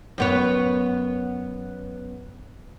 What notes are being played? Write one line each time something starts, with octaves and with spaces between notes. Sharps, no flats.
F#2 B3 C#5